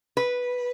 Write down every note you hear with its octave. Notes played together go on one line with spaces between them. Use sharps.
B4